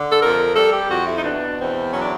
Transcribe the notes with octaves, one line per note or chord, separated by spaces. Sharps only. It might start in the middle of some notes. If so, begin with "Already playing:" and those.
Already playing: D3
A4
F2 A#4
G3 A4
G4
F2 F#4
E4
D#4
B2 D4
E2 C4
F#3 C#4
D4